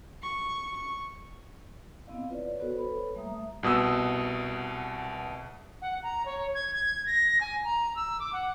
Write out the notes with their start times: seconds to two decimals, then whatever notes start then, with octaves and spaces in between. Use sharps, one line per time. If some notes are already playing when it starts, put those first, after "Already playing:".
0.22 C#6
0.77 C#6
2.07 B3 C4 E4 D#5 F5
2.29 F4 B4 C#5 D5
2.60 B3 F#4 A4 B4 C5
2.77 A4 B4 C#5 B5
3.15 G3 A3 A#3 E5 A#5 D#6
3.63 C2 B2 D#6 E6
5.82 F#5
6.03 A#5
6.26 C#5
6.54 G#6
6.74 G#6
7.06 A#6
7.41 G#5
7.64 A#5
7.96 E6
8.20 D6
8.33 F#5